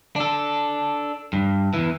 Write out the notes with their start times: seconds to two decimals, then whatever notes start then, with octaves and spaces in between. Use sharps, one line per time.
0.16 D4 A4
1.33 G2
1.74 E2 E3